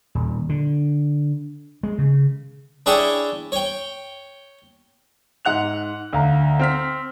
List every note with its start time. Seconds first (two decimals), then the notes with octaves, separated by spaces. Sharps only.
0.15 D#1
0.49 D3
1.83 G#3
1.98 C#3
2.86 D4 E4 G#4 C#5 G5 A5
3.52 C#5 G5
5.45 G#2 F#5 F#6 F7
6.13 D2 F5 A#5
6.59 C4 F6 B6